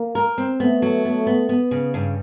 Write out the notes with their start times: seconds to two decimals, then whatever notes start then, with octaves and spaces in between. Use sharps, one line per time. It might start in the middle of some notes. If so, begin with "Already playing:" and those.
Already playing: A#3
0.15 A#4
0.38 C4
0.60 A3 B3
0.82 F#3
1.05 B3
1.27 B3
1.49 B3
1.71 C#3
1.94 G2